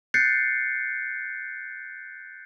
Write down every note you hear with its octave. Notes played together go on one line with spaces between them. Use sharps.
F#6 G6 A6 C7 C#7